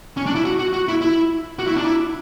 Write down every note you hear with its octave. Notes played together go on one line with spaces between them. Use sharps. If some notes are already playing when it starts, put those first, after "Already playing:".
C#4
D4
E4
F#4
F#4
F#4
E4
E4
F#4
E4
D4
E4